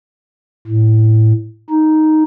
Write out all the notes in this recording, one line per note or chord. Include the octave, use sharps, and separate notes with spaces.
A2
D#4